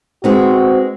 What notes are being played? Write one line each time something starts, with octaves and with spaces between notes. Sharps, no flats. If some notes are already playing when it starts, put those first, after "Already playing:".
G#3 B3 C4 D#4 F#4